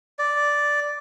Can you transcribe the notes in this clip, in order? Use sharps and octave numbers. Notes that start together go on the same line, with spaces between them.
D5